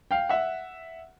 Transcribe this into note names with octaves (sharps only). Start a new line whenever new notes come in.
F5 G5
E5 F#5